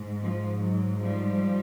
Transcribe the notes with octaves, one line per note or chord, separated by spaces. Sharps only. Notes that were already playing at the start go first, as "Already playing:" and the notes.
Already playing: G#2
F3
F#3
F3 G3